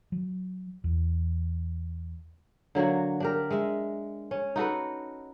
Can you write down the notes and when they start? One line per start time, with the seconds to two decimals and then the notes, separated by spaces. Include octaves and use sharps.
0.12 F#3
0.84 E2
2.75 D3 F#3 A#3 F#4
3.20 D4 G4 A#4
3.50 G#3 E5
4.31 C#4
4.56 D#4 F#4 A4 B4